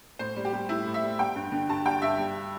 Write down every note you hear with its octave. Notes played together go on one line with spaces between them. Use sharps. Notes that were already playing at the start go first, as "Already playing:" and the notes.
A2 C5
G3
G4
G3
A2 E4
A2
E5
G3
G3 G5
G2
D3
G2 A5
G3 G5
G2 E5
G3